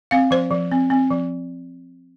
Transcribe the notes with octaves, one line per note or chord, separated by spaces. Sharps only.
C4 F5
F3 C5
F3
C4
C4
F3